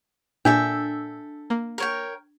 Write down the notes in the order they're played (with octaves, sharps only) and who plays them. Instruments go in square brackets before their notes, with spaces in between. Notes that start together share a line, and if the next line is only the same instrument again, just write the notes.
[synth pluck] A#2 [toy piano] D4 [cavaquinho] A4 E5 G5
[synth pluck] A#3
[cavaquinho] A#4 C#5 G5